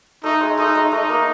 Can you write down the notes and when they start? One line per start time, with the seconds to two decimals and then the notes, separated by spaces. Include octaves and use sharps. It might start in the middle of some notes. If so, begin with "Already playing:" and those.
0.24 A3 D#4
0.41 G#3
0.58 A3 D#4
0.75 G#3
0.92 A3 D#4
1.09 A#3